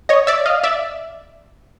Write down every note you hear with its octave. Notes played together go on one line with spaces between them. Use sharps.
C#5 D#5
D5 E5
D#5 F5
D5 E5